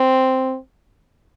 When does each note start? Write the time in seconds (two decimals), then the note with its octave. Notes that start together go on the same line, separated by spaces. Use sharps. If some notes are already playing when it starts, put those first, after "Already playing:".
Already playing: C4